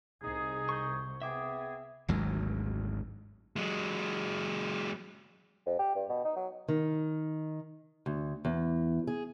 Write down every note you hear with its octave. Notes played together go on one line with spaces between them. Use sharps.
C2 D#4 G#4
C#6 G6
B3 C4 G#4 E5 D6
G#1 D2 G#2 F#3
F#3 G#3
F2
G4
G2
B2
D#4
F#3
D#3
D2
E2
G#4